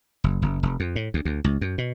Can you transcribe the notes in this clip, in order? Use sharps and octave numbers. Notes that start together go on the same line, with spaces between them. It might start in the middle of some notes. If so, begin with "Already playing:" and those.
F#1
F#1
F1
F2
A2
D2
D2
C#2
F#2
B2